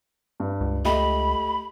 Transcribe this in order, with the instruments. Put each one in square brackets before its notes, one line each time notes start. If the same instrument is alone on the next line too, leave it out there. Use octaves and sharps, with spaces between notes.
[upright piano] G2
[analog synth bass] C#2
[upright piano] A3 G4 D#5 [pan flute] B5